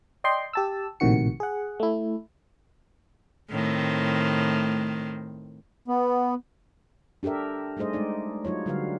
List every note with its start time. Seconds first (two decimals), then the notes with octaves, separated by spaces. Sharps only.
0.24 D5 D#5 G5 C6
0.53 G4 A5 E6
1.00 A#1 A2 C3 D#3 F#4 C#7
1.40 G#4 F#5
1.80 A3 E4
3.51 A2 D#3 C4
5.88 B3
7.23 D4 G4 A4 A#4 E5
7.77 G3 A3 D#4 G#4 C5 D#5
7.93 G#3 A3 D#4 D5
8.45 F#3 D#4 F4 C#5
8.66 D3 F#3 G3 F#4 B4 F5